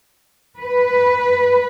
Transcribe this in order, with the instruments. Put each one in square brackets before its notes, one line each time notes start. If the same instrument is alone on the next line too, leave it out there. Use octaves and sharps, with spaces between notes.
[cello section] B4